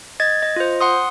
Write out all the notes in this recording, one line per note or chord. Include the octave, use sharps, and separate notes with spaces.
D#5 G#6 A6
D#5
F4 C5
F#5 C6 D#6